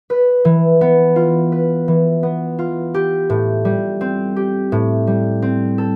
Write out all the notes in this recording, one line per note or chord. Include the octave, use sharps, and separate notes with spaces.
B4
E3
B3
F4
B4
E3
B3
F4
G4
A2
G3
C4
G4
A2
G3
C4
A4